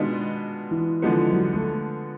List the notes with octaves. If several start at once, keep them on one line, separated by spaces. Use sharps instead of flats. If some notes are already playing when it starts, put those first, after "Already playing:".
Already playing: B2 D#3 G#3 B3 D4 F4
E3
D3 F3 G#3 B3
F#3
A3